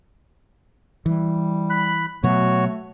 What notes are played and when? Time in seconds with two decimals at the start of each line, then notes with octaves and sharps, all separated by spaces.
1.06 E3 G3
1.70 B5 F#6
2.24 B2 F#3 A3 F#4 C#5